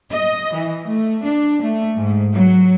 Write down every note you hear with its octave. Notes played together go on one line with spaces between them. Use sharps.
D#5
E3
A3
D4
A3
G#2
F#3